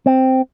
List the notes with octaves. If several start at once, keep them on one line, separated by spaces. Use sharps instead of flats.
C4